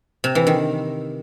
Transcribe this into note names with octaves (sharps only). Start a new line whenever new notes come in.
C3
E3
D#3